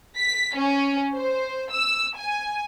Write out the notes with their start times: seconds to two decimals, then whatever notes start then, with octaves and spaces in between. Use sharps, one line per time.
0.18 B6
0.56 C#4
1.14 C5
1.72 E6
2.16 G#5